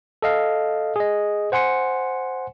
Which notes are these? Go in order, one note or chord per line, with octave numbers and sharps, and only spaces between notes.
A4 D#5 F5
G#4 D#5
C5 F#5 G#5 C6 C#7